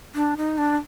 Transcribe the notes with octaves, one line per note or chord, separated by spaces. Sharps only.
D4
D#4
D4